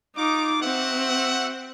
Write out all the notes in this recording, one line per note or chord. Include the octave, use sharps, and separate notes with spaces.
D#4 F4 D6
C4 F#4 E5 F#5